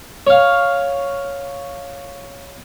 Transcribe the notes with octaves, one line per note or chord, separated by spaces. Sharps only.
C#5 F5